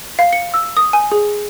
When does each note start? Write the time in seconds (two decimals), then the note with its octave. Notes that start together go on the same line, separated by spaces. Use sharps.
0.19 F5
0.33 C#7
0.54 E6
0.77 D#6
0.93 G#5
1.12 G#4